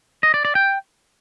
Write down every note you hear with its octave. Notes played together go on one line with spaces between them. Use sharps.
D#5
D5
D5
G5